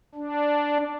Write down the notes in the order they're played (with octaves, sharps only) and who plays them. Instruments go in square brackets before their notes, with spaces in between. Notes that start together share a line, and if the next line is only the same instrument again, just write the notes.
[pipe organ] D4